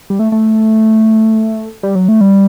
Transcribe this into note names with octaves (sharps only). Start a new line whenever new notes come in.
G3
A3
A3
G3
F#3
A3
G3